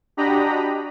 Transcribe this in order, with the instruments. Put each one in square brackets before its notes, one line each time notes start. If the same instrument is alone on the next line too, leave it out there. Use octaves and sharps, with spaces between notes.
[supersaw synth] D4 F#4 G4 D#5 A#5 B5